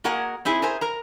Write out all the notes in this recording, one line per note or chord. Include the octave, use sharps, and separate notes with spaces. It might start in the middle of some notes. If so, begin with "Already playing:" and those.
A#3 F#4 G#4 A#4 D#5 F#5
C4 D#4 E4 G#4
G#4 A#4 C5 E5 G#5
A#4 A#5